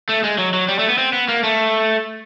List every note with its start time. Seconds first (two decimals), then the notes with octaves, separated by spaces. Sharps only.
0.09 A3
0.24 G#3
0.38 F#3
0.54 F#3
0.68 G3
0.79 A3
0.89 B3
0.98 C4
1.13 B3
1.29 A#3
1.43 A3